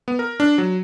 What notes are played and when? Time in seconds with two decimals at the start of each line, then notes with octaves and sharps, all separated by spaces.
0.08 B3
0.19 A#4
0.40 D4
0.58 F#3